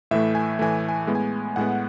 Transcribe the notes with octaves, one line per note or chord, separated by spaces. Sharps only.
A2 E3 A3 E5
G#5
A2 E3 A3 G#5
G#5
A2 G#3 B3
G#5
A2 G#3 B3 F#5